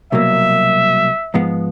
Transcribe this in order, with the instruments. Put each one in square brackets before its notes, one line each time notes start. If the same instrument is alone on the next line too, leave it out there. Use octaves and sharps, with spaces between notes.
[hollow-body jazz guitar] C2 B2 F#3 A#3 [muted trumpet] E5
[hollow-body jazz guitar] G#2 F3 G#3 B3